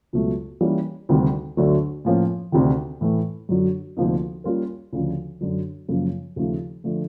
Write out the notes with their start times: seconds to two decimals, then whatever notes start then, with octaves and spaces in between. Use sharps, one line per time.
0.13 C#2 B2 F#3 A3
0.61 E3 G3 A#3 C#4 E4
1.09 D2 C3 D#3 G3
1.57 D2 D3 F#3 A3
2.05 A2 F3 A#3 C#4
2.52 D2 C3 D#3
3.01 A2 E3 A3
3.49 F#2 D3 F#3
3.97 D2 C3 F3 A#3 D#4
4.44 G3 A#3 C#4 F4 A#4
4.93 D2 C#3 F3
5.41 F#2 D3 F#3
5.89 F#2 C#3 F3 A#3
6.36 D#2 C#3 F3 A3
6.84 D3 F3 A3